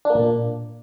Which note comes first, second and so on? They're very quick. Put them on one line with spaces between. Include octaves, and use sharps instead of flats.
D4 A#3 A#2